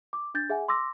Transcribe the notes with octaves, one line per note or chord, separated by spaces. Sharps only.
D6
D4 G6 A6
G#4 E5 F#5 G#5
C6 D6 E6 A#6